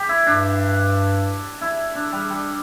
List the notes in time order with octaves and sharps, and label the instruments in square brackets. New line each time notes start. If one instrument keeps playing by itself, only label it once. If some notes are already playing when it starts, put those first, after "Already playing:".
Already playing: [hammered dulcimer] G4
E4
[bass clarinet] G2 [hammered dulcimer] D4
[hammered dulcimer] E4
D4
G3
G3